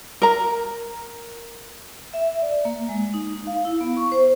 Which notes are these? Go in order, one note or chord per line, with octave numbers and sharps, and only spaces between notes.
A#4 A#5
E5
D5
A#3
G#3
D#4
F5
E4
B3
C#6
C5